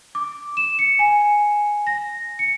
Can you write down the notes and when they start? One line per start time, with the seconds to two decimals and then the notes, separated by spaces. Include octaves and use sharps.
0.15 D6
0.57 E7
0.79 C#7
0.99 G#5
1.87 A#6
2.39 C#7